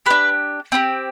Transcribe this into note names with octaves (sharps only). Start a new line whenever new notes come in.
D4 G4 B4
C4 E4 G4